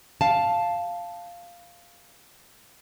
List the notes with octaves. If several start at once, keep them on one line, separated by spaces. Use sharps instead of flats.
F5 A5